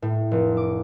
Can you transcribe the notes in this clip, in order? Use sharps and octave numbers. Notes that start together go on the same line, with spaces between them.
A2
F1
D6